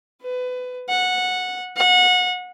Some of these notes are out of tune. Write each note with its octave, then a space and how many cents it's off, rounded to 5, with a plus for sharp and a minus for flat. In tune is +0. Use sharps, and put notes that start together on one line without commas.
B4 +25
F#5 -15
F#5 -30